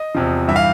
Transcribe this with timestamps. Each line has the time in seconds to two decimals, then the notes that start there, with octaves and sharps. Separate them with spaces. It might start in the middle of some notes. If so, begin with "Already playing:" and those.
Already playing: D#5
0.15 E2 C3 F3
0.48 G2 E3 E5
0.56 F5